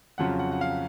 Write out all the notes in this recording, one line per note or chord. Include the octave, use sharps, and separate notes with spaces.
F2 C#3 F#3 C#4 F4 F#5
F#5
F#5
F5